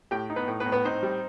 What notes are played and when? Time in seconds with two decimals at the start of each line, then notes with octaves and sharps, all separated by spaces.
0.11 A2 G4 G5
0.30 D#4
0.36 B3 B4
0.48 A2
0.60 B3 B4
0.66 A2
0.72 B3 B4
0.85 C4 D#4 C5
1.03 G3